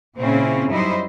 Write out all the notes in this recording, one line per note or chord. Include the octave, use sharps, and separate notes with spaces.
A#2 C#3 C4 C#4 E4
F#2 G3 D#4 E4 C5 D#5